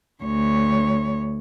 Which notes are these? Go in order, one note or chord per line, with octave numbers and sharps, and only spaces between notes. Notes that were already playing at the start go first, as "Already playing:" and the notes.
D2 C#5